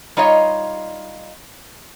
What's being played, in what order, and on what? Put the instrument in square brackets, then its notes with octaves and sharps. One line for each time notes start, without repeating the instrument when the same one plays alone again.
[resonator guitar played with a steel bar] G3 D#4 F4 C#5 D#5